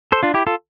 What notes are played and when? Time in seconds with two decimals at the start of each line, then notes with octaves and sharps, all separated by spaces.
0.12 A4 C5
0.23 D4 F4
0.34 E4 G4
0.47 F4 A4